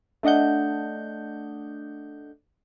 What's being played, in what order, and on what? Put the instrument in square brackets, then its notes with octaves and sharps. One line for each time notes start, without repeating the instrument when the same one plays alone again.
[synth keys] A3 D4 D#5 F#5 G6